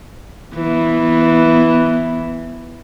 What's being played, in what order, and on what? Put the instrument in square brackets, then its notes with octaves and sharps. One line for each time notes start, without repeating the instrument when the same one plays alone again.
[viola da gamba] E3 B3